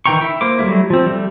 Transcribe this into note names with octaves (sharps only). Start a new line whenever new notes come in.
D#3 E3 G5 A#5 C#6
E4
A#3 C5 D6
F#3 G3 A3 E4
F3 C4
G3 A3